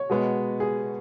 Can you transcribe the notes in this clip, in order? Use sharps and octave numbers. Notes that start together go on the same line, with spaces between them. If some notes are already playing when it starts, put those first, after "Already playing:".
Already playing: C#5
B2 G#3 B3
G#4